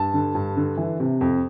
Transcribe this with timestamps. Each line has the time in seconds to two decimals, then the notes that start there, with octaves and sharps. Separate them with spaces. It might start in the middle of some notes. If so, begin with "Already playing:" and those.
Already playing: G2 A5
0.14 D3
0.35 G2
0.57 D3
0.78 E3
1.00 C3
1.21 F2